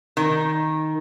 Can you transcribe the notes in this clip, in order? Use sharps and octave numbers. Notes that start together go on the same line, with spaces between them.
D#3